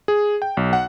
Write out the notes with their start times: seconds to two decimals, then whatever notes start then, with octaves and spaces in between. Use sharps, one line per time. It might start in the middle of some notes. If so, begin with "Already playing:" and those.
0.08 G#4
0.42 G5
0.57 B1
0.73 F#5